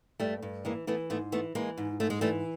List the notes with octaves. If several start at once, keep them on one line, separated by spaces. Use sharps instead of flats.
G2 G3 A3
G2
E3 G#3 A#3
E3 A3 B3
G#2 A3 B3
E3 A3 B3
E3 G#3 A#3
G#2
G#2 A3
G#3
E3 G3 A3